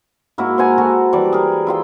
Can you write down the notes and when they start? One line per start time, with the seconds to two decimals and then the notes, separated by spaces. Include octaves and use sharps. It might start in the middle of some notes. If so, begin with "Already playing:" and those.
0.38 G#2 A#3 E4 F#4
0.58 C5 F#5 G#5 A#5
0.78 F#4 A4 A#4
1.13 E3 G3 D5 D6
1.33 G#4 A#4
1.67 E4 F4 G5